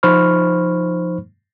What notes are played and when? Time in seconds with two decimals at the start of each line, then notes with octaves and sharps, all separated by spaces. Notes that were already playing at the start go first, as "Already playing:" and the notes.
0.03 F3 D#4 C5 B5 C#6 F6